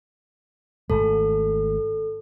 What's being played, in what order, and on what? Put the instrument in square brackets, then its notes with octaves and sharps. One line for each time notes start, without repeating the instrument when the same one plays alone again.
[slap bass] G#1 G#2 A3 [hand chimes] A4